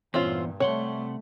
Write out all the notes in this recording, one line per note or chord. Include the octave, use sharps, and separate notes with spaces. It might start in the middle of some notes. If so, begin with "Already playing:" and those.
E2 G2 A#2 C4 C#4 F4
C3 G3 A3 C#5 F#5 C6